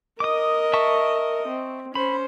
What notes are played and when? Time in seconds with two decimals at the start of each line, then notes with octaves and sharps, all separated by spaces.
0.20 A#4 D#5 D6 D#6
0.73 E5 A5 C#6
1.48 C4
1.95 C#4 C5 B5